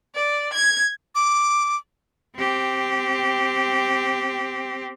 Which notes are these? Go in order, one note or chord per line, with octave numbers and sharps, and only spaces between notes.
D5
G#6
D6
C4 G4